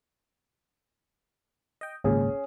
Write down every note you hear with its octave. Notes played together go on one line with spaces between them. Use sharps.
D#5 G5
G#1 C#2 A#2 C#4 G#4